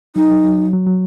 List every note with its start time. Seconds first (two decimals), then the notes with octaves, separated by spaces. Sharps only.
0.16 F#3 D#4
0.31 F#3
0.44 F#3
0.58 F#3
0.73 F#3
0.87 F#3